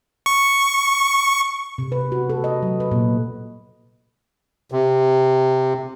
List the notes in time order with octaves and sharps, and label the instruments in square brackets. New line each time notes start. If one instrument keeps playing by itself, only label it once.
[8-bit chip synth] C#6
[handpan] C3
B4
F#4
A4
D#5
F#3
B4
A#2
[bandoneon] C3